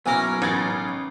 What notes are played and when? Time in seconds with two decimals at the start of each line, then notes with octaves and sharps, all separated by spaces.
0.06 B1 F#3 A#3 C#4 E4 A#4 G#5
0.42 A1 G#6 A6